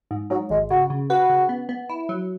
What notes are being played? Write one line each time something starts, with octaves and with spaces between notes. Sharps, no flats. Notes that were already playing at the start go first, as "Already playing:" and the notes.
G#2
G#2 F#3
G#1 G#3
C#3 F#4
C#3
F#4 B4
C#3
B3
B3
E4
F#3